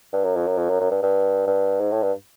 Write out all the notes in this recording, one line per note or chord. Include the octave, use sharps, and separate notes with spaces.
G2
F#2
F2
F#2
F2
F#2
F#2
G2
G2
G2
G#2
A2
G2